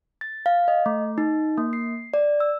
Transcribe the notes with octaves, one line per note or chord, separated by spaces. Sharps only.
A6
F5
D#5
A3
D#4
A#3
C7
D5
E6